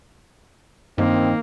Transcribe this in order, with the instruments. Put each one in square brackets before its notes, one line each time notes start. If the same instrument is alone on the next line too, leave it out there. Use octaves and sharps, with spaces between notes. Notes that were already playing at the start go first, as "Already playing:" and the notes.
[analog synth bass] G2 [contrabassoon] D#3 [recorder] A#3 [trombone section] C4